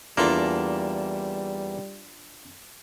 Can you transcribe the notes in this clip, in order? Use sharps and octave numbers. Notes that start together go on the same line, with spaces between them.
E2 G3 A#3 D4 F4 A4